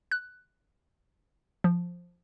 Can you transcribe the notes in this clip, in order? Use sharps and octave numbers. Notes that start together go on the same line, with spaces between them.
F#6
F3